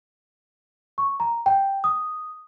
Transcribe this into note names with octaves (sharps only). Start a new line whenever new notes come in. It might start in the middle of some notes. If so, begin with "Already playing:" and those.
C#6
A#5
G5
D#6